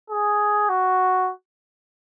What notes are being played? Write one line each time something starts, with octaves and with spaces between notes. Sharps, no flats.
G#4
F#4